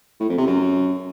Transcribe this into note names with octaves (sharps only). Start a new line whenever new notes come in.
A2
F2
C3
F#2